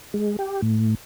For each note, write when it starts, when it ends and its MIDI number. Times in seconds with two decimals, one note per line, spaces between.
0.14 0.36 56
0.39 0.61 67
0.62 0.95 45